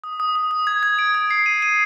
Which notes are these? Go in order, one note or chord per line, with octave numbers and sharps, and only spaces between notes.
D#6
D#6
D#6
D#6
G#6
G#6
D7
G#6
C7
D#7
D#7